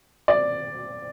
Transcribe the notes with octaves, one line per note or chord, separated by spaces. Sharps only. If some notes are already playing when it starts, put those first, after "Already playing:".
D5